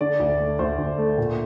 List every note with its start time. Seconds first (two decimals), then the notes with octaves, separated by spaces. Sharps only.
0.01 D3 D5
0.20 D2
0.39 A3
0.59 D2 C5
0.78 D2
0.98 A3
1.18 A#2